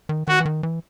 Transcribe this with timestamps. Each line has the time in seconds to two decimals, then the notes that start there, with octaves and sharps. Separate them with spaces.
0.09 D#3
0.28 D#3 F#4
0.40 E3
0.45 D#3
0.63 E3